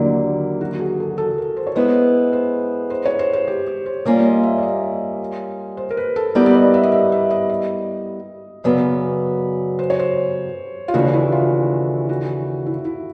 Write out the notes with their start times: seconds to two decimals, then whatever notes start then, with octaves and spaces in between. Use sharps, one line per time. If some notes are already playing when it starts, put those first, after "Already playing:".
Already playing: D#2 D3 F#3 A#3 E4
0.61 F#4
0.80 G#4
1.00 A4
1.18 A4
1.38 A#4
1.57 C5
1.67 C#5
1.75 G#3 B3 E4 C5
2.33 C5
2.90 C5
3.06 C#5
3.19 C5
3.33 C5
3.47 G4
3.67 G4
3.86 C5
4.05 G3 A#3 C#4 F4 D5
4.25 D#5
4.43 E5
4.58 D5
4.63 D#5
5.77 C5
5.91 A#4
5.97 B4
6.16 A4
6.35 G3 B3 E4 G4 A#4 D5
6.46 D5
6.54 D#5
6.74 E5
6.83 D#5
6.92 E5
7.12 E5
7.30 D#5
7.49 D#5
8.64 F#2 C#3 F#3 B3 D5
9.79 C5
9.90 C#5
9.99 C5
10.88 F4
10.94 D#2 C#3 E3 A3 D4 F#4
11.13 E4
11.32 F4
12.09 F#4
12.66 E4
12.85 E4